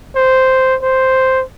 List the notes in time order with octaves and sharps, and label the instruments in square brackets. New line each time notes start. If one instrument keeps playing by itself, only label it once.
[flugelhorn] C5
C5